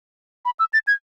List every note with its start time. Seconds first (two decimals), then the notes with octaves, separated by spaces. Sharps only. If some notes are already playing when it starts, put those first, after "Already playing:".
0.45 B5
0.59 E6
0.73 A6
0.87 G#6